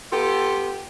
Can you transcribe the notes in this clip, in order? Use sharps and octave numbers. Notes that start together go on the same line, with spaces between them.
B3 F4 G4 A4